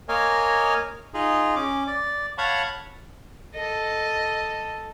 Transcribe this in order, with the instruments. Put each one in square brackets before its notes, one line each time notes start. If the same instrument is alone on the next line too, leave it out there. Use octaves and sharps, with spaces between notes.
[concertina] A#3 A#4 C#5 D#5 F5 G#5
D#4 F4 G#4 D#5
C#4 D6
D5
C#5 F5 F#5 A5 B5 C#6
[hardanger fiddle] A4 D#5